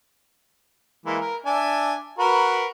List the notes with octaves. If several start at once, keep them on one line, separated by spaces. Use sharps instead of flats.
E3 G#3 A#3
A#4
D4 E5 G#5
F#4 A#4 B4